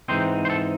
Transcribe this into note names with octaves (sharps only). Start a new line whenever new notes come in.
G#2 E3 C4 D#4 C5
C5
A4